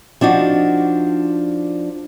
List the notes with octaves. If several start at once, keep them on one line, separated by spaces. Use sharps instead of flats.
F3 D4 D#4 F#4